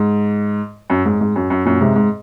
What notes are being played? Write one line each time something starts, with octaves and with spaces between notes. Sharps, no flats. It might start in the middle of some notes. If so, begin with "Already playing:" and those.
Already playing: G#2
F#2
G#2
G#2
F#2
F#2
F#2 A#2
G#2 C3
G#2